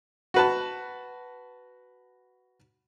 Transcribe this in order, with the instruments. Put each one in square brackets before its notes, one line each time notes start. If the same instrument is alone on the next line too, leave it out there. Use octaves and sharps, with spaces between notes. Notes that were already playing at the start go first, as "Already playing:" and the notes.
[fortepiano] F#4 B4 A5